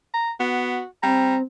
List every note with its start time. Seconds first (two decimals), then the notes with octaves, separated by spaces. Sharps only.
0.14 A#5
0.40 B3 F#4
1.03 G3 C4 A#5